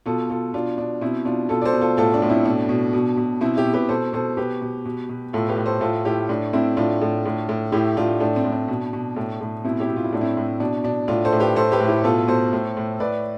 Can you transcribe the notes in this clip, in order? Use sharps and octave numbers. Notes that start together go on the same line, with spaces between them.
B2 F4 A4
B2 F4 A4
B2 D4 F4
B2 D4
B2 C4 E4
B2 D4 F4
B2 F4 A4
D5
A4 C5
B2
F4 A4
A2 F4 A4
D4
A2
C4 E4
B2 D4
B2
B2
B2
B2 C4 E4
E4 G4
B2
G4 B4
B2 A4 C5
B2 A4 C5
B2 G4 B4
B2
B2
B2
A2 F4 A4
G4 B4
A2
A4 C5
A2 F4 A4
A2 E4 G4
A2 D4
A2 C4 E4
A2 D4 F4
A2
A2
A2
A2 E4 G4
A2 D4 F4
A2 D4
C4
A2
D4
B2
B2
A2
A2
B2 C4 E4
E4 G4
B2
F4
E4
A2 D4
C4 E4
A2
B2 D4
B2 D4
A2 D4 F4
A4 C5
A2
G4 B4
A2 A4 C5
G4 B4
A2
E4 G4
B4
B2 F4 A4
B2 A4 C5
A2
A2
A2 B4 D5